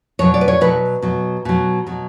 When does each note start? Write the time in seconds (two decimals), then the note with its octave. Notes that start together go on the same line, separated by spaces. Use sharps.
0.19 B2 F#3 C#5
0.34 D5
0.41 B4
0.48 C#5
0.61 B2 F#3 B4
1.02 B2 F#3
1.45 B2 F#3
1.87 B2 F#3